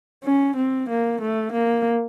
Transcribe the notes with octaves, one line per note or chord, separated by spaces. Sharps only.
C#4
C4
A#3
A3
A#3